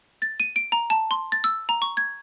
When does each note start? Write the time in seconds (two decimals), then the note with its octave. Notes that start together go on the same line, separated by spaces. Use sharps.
0.22 A6
0.40 D#7
0.56 D7
0.72 A#5
0.90 A5
1.11 C6
1.32 A6
1.44 E6
1.69 A#5
1.82 C#6
1.97 G#6